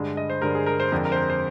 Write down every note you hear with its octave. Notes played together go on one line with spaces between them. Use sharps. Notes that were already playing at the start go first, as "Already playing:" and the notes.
Already playing: G2 D3 G#3
D#5
C5
G2 D3 G#3 A#4
G#4
A#4
C5
F2 D3 G#3 A#4
A#4
C5
A#4
C5